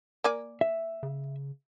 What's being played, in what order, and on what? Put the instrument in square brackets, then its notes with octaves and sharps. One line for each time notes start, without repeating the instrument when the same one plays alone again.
[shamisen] A#3 D5 G#5
[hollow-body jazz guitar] E5
[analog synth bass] C#3